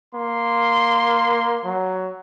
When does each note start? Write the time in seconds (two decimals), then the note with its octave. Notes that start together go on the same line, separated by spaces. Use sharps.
0.15 A#3 C6
1.65 F#3